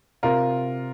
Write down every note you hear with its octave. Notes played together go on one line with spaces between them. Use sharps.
C3 F4 A#4